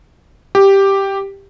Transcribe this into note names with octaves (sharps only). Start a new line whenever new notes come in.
G4